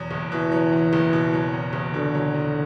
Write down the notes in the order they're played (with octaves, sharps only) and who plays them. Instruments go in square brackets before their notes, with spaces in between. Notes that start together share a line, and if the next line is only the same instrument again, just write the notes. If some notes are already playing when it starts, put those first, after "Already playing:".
Already playing: [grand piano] E2 B2 F#3
F#1
[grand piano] B2 [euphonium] E3
[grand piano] F#3
E2
F#1
B2
F#3
E2
F#1
[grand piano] B2 [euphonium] D3
[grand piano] F#3
E2